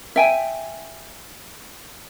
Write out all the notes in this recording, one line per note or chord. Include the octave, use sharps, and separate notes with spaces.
E5 G5 G#5